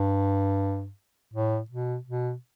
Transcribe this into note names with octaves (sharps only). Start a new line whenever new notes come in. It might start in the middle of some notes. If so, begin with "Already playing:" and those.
Already playing: G2
A2
B2
B2